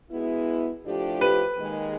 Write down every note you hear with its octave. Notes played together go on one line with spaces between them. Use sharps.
B2 G#3 B3 E4
A2 F3 A3 D4 G4
B4
D#2 D#3 G#3